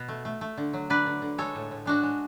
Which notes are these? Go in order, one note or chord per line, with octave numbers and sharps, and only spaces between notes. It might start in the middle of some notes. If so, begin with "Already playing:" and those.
Already playing: B2
A3
A3
A3
D3
F#3
D3 B4 D5
D3
D3
G#3 A4 C#5
A2
A2
G#3 D4 F#4
G#3